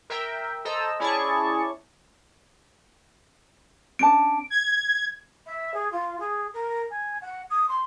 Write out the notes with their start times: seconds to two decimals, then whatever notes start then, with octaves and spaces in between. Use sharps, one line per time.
0.10 A#4 E5 G5
0.65 A4 C5 D#5 A#5 E6
1.00 C#4 E4 G#4 D5 A5 C#6
3.99 C#4 D4 A5 D7
4.50 G#6
5.46 E5
5.74 G#4
5.92 F4
6.19 G#4
6.53 A#4
6.90 G#5
7.21 F#5
7.50 D#6
7.68 C6